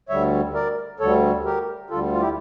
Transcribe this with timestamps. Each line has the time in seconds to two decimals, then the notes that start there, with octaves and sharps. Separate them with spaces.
0.09 D2 D3 G3 C#5 E5
0.54 A#4 D5
1.00 D2 D3 G3 A4 C#5
1.45 G4 A#4
1.90 D2 D3 G3 F4 A4
2.12 F4
2.20 E4 G4